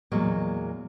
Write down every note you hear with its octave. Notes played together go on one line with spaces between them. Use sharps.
E2 A#2 F#3 G#3 A#3